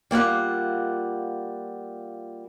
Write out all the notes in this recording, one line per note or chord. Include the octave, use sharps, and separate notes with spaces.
G3 A#3 F4 F#5